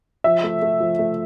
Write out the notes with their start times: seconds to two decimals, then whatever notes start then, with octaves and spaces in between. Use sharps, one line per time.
0.24 F3 E5
0.44 A3
0.62 A3
0.80 F3
0.99 A3